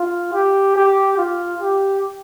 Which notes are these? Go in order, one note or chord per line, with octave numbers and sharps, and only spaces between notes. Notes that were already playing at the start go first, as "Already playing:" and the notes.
Already playing: F4
G4
G4
F4
G4